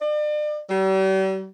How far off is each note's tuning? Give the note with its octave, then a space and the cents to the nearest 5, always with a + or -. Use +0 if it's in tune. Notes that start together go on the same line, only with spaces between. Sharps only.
D5 +40
G3 -40